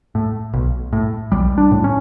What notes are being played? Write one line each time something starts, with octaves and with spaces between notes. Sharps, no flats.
A2
B1
A2
B1 G3
D4
A2
C#4